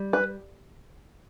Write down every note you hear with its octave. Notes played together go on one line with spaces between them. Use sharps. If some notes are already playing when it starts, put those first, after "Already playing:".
Already playing: G3
B4